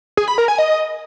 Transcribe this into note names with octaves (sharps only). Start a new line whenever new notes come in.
G#4
B5
A#4
G#5
D#5